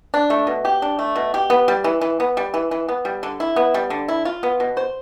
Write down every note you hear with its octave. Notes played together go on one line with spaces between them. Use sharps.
D4
A3
B2
G4
D4
A3
B2
G4
B3
G3
E3
E3
B3
G3
E3
E3
B3
G3
D3
E4
B3
G3
D3
E4
F4
B3
B2
C5